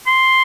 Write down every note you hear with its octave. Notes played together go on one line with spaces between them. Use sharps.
C6